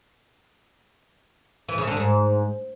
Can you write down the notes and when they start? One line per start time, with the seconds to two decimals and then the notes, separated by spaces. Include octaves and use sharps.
1.69 E3
1.78 C#3
1.87 D3
1.97 G#2